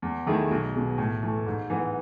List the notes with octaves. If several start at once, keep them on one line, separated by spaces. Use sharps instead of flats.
E2
D#3 A3 E4 G#4
B1
B2 G#3
A2
E3 A3
G#2
E3 B3